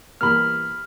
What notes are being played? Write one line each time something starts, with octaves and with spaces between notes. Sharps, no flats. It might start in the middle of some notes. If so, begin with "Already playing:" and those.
E2 G3 A#3 B5 F6